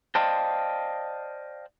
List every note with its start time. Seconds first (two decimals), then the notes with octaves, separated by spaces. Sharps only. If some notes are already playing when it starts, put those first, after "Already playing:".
0.15 C5 D5 D#5 F5 G5 A5